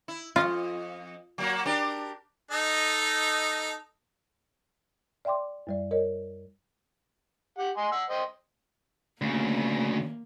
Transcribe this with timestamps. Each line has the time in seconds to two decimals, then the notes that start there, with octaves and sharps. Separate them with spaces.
0.08 E4
0.36 F2 F4 D#5
1.38 F#3 A#3 F#4
1.65 D4 G4 A#4
2.51 D#4 A4 D#5
5.25 D5 E5 G5 C6 D6
5.67 F#2 G3 D5
5.91 A#4 C#5 D#5
7.58 G4 F#5
7.77 D#5 G#5 C6
7.92 F#5 E6
8.10 C5 D#5 G5
9.21 D2 C#3 A#3